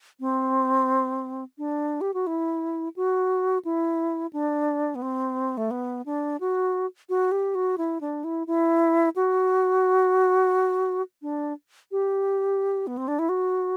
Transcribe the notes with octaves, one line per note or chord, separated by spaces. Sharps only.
C4
D4
G4
F#4
E4
F#4
E4
D4
B3
C4
A3
B3
D4
F#4
F#4
G4
F#4
E4
D4
E4
E4
F#4
D4
G4
B3
C4
D4
E4
F#4